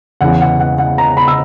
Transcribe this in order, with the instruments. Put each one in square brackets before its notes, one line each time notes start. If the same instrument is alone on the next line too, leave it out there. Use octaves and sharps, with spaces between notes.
[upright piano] E2 C#3 E3 F#5
F#5
F#5
F#5
A#5
B5
E6